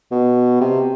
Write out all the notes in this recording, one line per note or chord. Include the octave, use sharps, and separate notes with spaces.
B2
C3